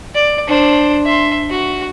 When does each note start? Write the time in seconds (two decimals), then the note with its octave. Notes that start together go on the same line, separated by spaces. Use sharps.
0.15 D5
0.48 D4 C5
1.06 E5 C6
1.50 F#4